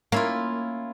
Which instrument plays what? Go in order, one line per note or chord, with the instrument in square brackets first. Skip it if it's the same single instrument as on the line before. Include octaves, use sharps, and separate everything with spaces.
[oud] A#3 [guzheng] C#4 E4 F4